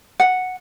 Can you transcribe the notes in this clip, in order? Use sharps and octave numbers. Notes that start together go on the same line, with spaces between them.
F#5